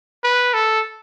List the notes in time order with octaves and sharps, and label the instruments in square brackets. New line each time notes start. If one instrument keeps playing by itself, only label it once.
[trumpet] B4
A4